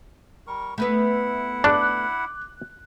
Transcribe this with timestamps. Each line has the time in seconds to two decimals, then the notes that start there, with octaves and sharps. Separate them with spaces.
0.47 G3 A#4 C#6
0.78 A3 B3 E4 B4 F#5
1.64 D4 D6 F#6